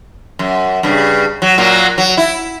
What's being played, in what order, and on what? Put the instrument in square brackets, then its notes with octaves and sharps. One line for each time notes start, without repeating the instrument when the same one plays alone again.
[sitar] F#2
G2 C#3
F#3
A#2 F#3 A#3
F#3
E4